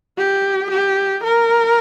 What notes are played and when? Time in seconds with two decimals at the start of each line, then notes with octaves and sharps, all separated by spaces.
0.18 G4
0.70 G4
1.23 A#4